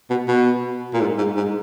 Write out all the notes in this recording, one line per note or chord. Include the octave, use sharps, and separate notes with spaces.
B2
B2
A#2
G#2
G#2
G#2